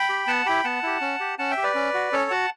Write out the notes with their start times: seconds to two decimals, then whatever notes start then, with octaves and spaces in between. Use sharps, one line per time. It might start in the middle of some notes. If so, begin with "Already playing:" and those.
Already playing: G5 B5
0.09 G4
0.27 B3 F#5 A5
0.46 E4 G4 G5 B5
0.64 B3 F#5 A5
0.83 E4 G4
1.01 C#4
1.20 G4
1.38 C#4 F#5 A5
1.50 E5 G5
1.57 G4
1.63 B4 D5
1.75 C#4
1.94 F#4
2.12 C#4 A4 C#5
2.31 F#4 F#5 A5